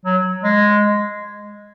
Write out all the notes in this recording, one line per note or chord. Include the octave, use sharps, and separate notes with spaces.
F#3
G#3